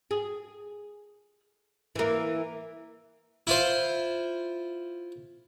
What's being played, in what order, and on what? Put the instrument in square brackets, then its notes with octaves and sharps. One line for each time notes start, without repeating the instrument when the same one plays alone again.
[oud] G#4
E3 A#3
[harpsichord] E4 F4 C5